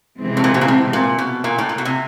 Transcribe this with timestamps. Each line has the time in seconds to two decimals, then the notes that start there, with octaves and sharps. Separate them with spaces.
0.18 C3 E3 G#3 C4
0.37 A2
0.44 A#2
0.54 B2
0.61 A#2
0.68 A2
0.93 A#2
1.18 B2
1.44 A#2
1.58 A2
1.69 A#2
1.78 B2
1.85 C3